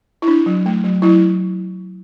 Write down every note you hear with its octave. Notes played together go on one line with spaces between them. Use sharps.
E4
D4
F#3
A3
F#3
F#3 E4